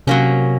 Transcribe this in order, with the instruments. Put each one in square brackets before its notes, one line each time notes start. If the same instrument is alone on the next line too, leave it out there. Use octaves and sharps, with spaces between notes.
[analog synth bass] C3 [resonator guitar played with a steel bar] F#3 A#3 C#4